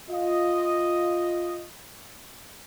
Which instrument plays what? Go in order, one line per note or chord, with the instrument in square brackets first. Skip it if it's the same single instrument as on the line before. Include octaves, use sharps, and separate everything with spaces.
[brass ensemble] F4 D#5